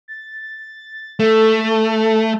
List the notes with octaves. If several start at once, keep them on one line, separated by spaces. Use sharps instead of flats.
A6
A3 A4